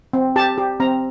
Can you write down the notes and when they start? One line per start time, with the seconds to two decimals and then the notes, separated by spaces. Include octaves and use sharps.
0.13 C4
0.36 G4 A5
0.58 G4
0.80 C4 A#5